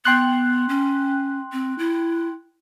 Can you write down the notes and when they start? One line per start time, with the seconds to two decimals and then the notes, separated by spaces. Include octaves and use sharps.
0.05 B3 G5 C6 F#6
0.69 C#4
1.53 C4
1.79 E4